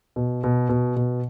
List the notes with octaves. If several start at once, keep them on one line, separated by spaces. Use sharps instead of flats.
B2
B2
B2
B2